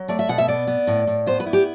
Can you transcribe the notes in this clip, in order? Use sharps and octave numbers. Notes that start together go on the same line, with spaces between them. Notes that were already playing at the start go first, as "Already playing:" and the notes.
Already playing: F#3
A3 D5
E5
B2 F#5
E5
B3 D5
B3
A2
A2
B3 C5
B4
E4
G4